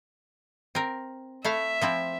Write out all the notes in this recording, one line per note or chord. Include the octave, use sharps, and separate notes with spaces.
C4 A#4
A3 E4 E5 F5
F3 C4 E4